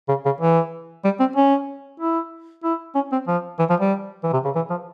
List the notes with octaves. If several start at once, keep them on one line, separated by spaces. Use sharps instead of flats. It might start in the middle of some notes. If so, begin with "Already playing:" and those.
C#3
C#3
E3
G3
C4
C#4
E4
E4
C#4
C4
F3
E3
F3
G3
E3
C3
C#3
E3
F3